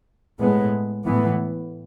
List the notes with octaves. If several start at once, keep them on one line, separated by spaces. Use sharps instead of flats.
A2 G#3 B3
A2 E3 B3